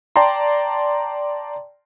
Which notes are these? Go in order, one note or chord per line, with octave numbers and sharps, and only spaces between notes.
D5 G5 A5 A#5 C6